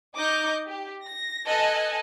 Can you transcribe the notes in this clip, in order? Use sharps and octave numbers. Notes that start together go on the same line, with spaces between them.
D#4 D#5 D6 G6
G4
A#6
A4 B4 D#5 G#5 A5 F#6